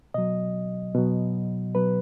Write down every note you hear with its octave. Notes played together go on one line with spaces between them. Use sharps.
B2 F#3 D#5
B2 F#3
B2 F#3 B4